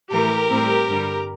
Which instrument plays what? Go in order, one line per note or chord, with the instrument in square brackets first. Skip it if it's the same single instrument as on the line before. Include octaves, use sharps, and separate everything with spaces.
[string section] A2 E3 A3 G4 A#4
A2 G3 C4
G2 D3 G3